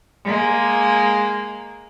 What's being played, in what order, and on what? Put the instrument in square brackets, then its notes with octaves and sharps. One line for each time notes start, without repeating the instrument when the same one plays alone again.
[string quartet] G#3 A#3